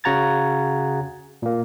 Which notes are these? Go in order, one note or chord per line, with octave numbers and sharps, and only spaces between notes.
C#3 F#4 F#5 A#5 G#6 A6
A#2 A#3